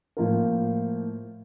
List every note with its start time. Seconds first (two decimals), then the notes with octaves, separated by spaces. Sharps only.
0.17 A2 F3 A#3 F4 A#4